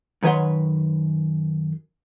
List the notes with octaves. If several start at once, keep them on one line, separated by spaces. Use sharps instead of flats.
F#2 D#3 B4 C#5 F#5 C6